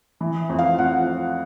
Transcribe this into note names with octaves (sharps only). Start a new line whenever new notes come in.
E3
F2
F5
F2 F#5